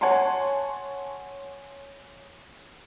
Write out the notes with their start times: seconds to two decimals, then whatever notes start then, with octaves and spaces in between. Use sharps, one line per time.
0.01 C#5 F#5 G#5 A5 C6